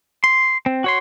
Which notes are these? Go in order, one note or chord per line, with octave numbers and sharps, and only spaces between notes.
C6
C4
F#4 C#5 C6